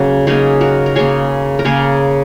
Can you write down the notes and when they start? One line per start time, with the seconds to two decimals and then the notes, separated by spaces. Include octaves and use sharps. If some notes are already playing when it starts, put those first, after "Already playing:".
Already playing: C#3 F#3 A#3 C#4 F#4 G#4
0.27 C#3 F#3 A#3 D#4 G#4
0.61 F#4 A#4
0.86 A#4
0.95 C#3 A#3 G#4 C#5
1.59 A#4
1.65 C#3 A#3 G#4 C#5